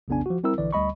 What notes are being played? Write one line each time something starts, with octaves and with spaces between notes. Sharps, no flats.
B1 F2 C#3 B3 D4 G#5
F3 F#4
G3 C4 E4 A#4 E6
A#1 D3 E3 D5
D2 G3 D#5 B5 C#6